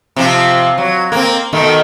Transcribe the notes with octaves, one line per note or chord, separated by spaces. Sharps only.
C3 F3 F4
F#3
A#3 C4
B2 D#3 A3